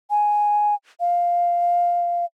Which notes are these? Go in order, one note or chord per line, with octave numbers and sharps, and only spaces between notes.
G#5
F5